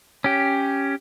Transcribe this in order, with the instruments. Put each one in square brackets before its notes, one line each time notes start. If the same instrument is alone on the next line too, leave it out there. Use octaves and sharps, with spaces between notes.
[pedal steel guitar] C#4 G4